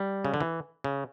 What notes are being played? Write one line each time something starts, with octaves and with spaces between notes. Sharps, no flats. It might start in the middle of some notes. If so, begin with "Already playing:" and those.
Already playing: G3
C#3
D3
E3
C#3